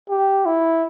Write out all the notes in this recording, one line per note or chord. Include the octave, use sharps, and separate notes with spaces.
G4
E4